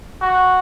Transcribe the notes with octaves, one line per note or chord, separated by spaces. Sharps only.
F#4